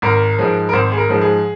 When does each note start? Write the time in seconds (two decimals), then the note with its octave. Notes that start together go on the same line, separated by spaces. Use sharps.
0.02 G#1 A#4
0.39 G#2 F3 G#3
0.69 A#4
0.73 G#1 C5
0.92 G#4
0.97 A#4
1.09 G#2 F3 G#3
1.21 G#4